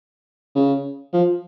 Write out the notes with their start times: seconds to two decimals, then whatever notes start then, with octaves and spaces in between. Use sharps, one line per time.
0.55 C#3
1.13 F3